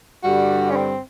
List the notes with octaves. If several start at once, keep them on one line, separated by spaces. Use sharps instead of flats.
G2 D3 G3 F#4
C#4
C4